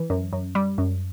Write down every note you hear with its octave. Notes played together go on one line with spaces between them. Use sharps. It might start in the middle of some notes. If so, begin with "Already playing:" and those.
Already playing: E3
F#2
F#2
G3
F#2